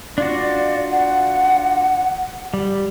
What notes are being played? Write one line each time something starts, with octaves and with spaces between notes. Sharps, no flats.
D4 F4 F#4 D5
F#5
G3